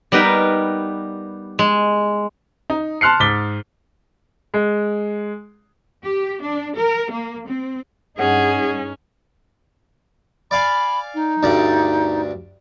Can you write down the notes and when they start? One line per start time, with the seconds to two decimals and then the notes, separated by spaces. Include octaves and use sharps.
0.12 G3 B3 D#4 A#4 B4
1.59 G#3
2.70 D#4
3.01 A5 C6 F6 F#6 C7 C#7
3.20 G#2 D6 A6 B6 G7
4.54 G#3
6.03 G4
6.42 D4
6.76 A#4
7.11 A#3
7.48 C4
8.19 G2 C#4 D#4 G#4 F#5
10.51 D5 F5 G#5 B5
11.14 D#4
11.43 D2 G2 D5